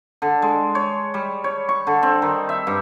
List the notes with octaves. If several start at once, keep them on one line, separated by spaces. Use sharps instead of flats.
D3
G#3
C#5
G3
C#5
C#6
D3
C4
D#3
E5
G2